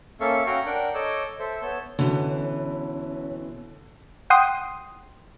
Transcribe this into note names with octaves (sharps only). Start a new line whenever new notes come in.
A#3 C#4 A4 E5 F5 C#6
C#4 F#4 F5 G5 A#5 C#6
D4 A#4 F#5 G5
A4 C#5 D#5 D6 E6 G6
A4 C5 E5
B3 C#5 A5 G6
B2 D3 E3 C#4
F#5 G5 C6 D#6